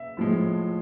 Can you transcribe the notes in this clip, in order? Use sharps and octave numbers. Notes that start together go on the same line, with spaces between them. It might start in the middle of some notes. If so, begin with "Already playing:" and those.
Already playing: E5
A2 F3 G#3